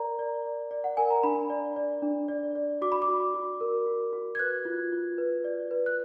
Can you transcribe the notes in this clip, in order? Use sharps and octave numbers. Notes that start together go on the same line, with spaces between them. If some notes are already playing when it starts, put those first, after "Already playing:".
Already playing: A#4 D5 A#5
D5
D5
D5
F#5
A#4 G#5
A#5
D4 B5
D5
D5
D4
D5
D5
F#4 D6
B5
D6
F#4
F#4
A#4
F#4
F#4
G#6
B4 F#6
F4
F4
B4
D5
B4
F#6